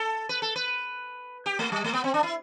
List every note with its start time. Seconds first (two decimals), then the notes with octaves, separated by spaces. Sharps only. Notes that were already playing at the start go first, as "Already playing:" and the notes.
Already playing: A4
0.29 B4
0.42 A4
0.56 B4
1.46 G4
1.59 A3
1.72 G3
1.84 A3
1.93 B3
2.04 C4
2.14 D4
2.23 E4